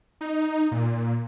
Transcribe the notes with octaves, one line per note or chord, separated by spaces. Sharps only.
D#4
A#2